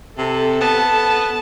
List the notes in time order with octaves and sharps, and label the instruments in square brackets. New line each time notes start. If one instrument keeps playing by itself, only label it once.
[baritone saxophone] C3 [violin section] A4
[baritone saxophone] B3 [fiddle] A5